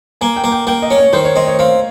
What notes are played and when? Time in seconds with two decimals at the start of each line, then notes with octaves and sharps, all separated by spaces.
0.21 A#3 G#5
0.37 G5
0.44 A#3
0.52 G5
0.67 A#3 G5
0.82 D#5
0.91 C#4
0.98 C#5
1.13 D#3 C5
1.25 C#5
1.36 C4 D#5
1.48 C#5
1.59 C4 F5